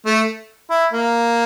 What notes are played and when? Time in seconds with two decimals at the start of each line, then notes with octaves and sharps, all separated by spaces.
0.06 A3
0.70 E4
0.93 A#3